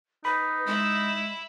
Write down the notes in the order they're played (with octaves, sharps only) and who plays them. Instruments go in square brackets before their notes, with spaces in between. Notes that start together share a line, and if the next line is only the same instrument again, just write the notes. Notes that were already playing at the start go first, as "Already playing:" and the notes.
[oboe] D#4 [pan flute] B4 [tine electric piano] B5
[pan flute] G#3 [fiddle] E4 E5